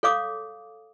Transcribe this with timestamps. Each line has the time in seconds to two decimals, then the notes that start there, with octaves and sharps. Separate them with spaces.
0.03 A4 C#5 F5 D6 D#6